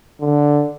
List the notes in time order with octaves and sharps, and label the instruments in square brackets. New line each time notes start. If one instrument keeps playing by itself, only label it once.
[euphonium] D3